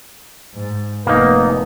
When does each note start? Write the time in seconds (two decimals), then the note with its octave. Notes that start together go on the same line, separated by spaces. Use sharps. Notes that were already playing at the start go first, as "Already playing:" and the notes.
0.55 G#2
1.07 F1 A#3 B3 D#4